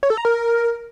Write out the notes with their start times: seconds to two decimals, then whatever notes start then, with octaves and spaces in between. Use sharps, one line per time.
0.03 C#5
0.10 A4
0.17 A#5
0.25 A#4